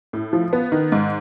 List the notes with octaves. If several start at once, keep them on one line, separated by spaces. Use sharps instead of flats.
A2
F3
B3
D#3
G#2